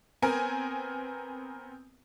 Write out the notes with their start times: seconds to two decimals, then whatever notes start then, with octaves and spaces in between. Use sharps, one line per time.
0.22 B3 C4 A#4 G#5